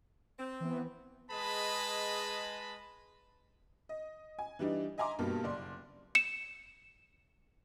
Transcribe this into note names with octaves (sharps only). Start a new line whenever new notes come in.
C4
E3 B3
G#3 G#4 B4 D#5 A5 B5
D#5
G#5
E3 G3 D4 D#4
D#5 E5 G#5 A#5 C6 D6
G2 B2 G3 A#3
F#1 D5 C6
C#7 E7